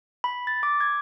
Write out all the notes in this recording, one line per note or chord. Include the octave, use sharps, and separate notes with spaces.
B5
A6
D6
G#6